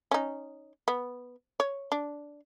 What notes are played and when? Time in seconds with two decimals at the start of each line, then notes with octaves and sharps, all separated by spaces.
0.11 C#4 D#4
0.88 B3
1.60 C#5
1.92 D4